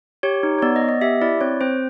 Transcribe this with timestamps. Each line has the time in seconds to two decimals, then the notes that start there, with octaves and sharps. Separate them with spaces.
0.23 G4 C#5
0.43 D#4
0.59 C#5
0.62 B3 D5
0.76 D#5
0.82 B3
0.89 D#5
1.01 G4 E5
1.21 E4 D5
1.41 C4 C#5
1.61 C4 C5